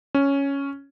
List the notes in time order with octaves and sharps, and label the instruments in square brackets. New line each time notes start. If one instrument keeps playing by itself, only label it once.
[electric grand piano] C#4